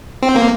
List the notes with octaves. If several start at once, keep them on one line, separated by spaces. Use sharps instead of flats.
C4
A#3